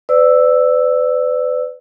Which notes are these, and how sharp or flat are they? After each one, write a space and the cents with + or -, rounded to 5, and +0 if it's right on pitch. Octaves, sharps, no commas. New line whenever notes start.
B4 +35 D5 +0 E6 +0